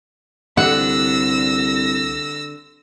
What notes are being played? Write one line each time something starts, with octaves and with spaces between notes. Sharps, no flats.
C2 D3 C4 G4 F#5 E6 A#6